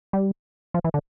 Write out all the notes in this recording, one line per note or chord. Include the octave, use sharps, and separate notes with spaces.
G3
F3
E3
D3